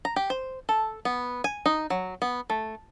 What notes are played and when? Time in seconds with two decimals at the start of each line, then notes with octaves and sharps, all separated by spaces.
0.05 A#5
0.16 G4
0.30 C5
0.69 A4
1.05 B3
1.44 G#5
1.66 D#4
1.90 F#3
2.22 B3
2.50 A3